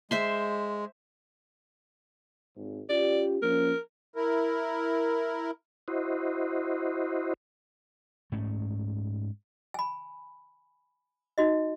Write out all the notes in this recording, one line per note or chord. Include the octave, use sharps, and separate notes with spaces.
G#3 C5 E5 C6
G#1
C#4 F4 G4 D5
F3 A#3 C#4 A#4
E4 A#4
E4 F#4 C5 D#5
G#2 A3 C#4
G#5 B5
D#4 F#4 D#5